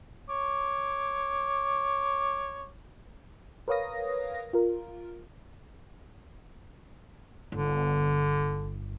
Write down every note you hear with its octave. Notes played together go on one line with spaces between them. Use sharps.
C#5 D6
A#4 B4 C#5 F5 D#6 A#6
F4 A#4
G1 D3